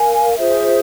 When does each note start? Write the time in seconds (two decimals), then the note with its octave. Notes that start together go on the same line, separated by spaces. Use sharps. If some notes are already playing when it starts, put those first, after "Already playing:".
Already playing: A#4 F5 G#5
0.36 F4 G#4 C5 E5